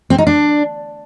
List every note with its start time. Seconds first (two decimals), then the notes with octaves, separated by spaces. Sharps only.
0.10 C4
0.18 D#4
0.27 D4